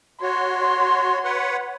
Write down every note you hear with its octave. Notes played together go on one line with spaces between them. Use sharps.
F#4 C#5 C6
B4 C#5 F#5